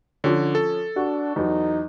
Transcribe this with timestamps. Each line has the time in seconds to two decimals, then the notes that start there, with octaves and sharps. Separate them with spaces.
0.24 D3 F3 C#4
0.55 A4
0.96 D4 F#4
1.36 E2 F#3 D#4